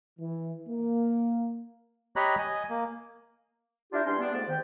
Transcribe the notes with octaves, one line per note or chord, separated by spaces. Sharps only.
E3
A#3
G4 C#5 D#5 A#5 B5 F#6
D#5 G#5
A#3
D4 E4 F4 G4 A#4 C5
E2 G3 C#4 D4 C6
G3 B3 D4
F2 G#2 A3 B3 D5
G#2 D#3 G5